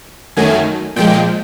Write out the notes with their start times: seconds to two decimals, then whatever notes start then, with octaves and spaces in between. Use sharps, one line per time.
0.37 F#2 D#3 F#3 A3 G#5
0.96 A#2 F3 G#3 G5